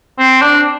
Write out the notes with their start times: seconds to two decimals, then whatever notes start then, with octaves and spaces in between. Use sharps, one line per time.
0.19 C4
0.41 D4